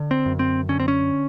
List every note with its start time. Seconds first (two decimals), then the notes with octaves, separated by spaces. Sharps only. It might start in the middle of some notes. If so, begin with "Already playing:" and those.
Already playing: D3
0.11 C4
0.26 F#2
0.39 C4
0.69 D3 C#4
0.80 C4
0.88 C#4